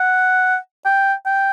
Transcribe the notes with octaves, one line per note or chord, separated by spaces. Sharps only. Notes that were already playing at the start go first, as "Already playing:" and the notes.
Already playing: F#5
G5
G5